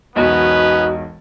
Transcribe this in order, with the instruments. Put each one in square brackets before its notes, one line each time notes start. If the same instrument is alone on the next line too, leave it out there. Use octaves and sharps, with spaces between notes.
[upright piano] E1 B1 [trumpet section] B3 C#4 B4 [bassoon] D#4 [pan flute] F#4